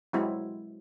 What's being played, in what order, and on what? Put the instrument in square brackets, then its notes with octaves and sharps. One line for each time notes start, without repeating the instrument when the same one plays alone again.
[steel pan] F#3 G#3 C4 E4